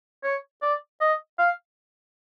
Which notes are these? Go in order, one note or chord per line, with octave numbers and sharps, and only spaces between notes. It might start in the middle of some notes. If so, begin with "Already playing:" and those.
C#5
D5
D#5
F5